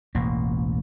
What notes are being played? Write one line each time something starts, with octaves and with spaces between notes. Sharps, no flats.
E1 A1 A#3